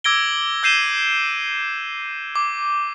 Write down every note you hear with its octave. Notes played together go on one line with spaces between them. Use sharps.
D6 E6 G#6 A#6 D7 G7
E6 G6 C7 D#7 E7 G7
D6